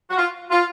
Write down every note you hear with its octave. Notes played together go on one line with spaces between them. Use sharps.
F#4
F4
F4